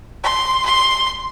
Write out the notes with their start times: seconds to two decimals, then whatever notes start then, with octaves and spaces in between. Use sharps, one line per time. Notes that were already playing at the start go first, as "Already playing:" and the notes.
0.23 C6
0.65 C6